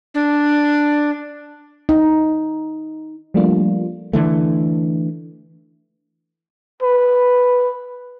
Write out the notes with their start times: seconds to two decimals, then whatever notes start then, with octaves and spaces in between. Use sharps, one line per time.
0.14 D4
1.89 D#4
3.34 F3 G3 A3 A#3 D4 F4
4.13 D3 E3 A3
6.83 B4